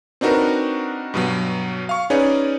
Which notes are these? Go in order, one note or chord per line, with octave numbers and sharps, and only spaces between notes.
C4 D4 D#4 F#4 A#4 B4
G2 B2 F#3
F5 C#6
C#4 D#4 G#4 B4 C#5 D5